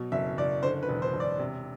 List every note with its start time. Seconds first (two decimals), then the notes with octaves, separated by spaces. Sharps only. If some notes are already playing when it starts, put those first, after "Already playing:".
Already playing: B2 F#3
0.12 F#1 E5
0.37 F#1 D5
0.63 D3 C5
0.83 B4
0.89 E1
1.02 C5
1.14 E1
1.20 D5
1.39 C3